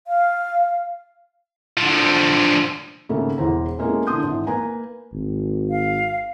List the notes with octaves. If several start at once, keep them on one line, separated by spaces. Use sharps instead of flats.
F5
D3 F3
G#1 C#3 A3 A#3
E1 E2 E4 C5 A#5
G#3 A#3 B3 C#4 E4 A4
D3 E3 A5 C6 D#6 G6
G#1 E3
A#3 B4 G#5 A#5
G#1
F5